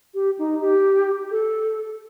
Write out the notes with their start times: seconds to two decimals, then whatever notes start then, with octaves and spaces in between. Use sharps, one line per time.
0.14 G4
0.39 D#4
0.61 G4
1.31 A4